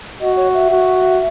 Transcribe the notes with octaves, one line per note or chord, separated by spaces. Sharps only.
F#4 D#5
C#5
E5
F#4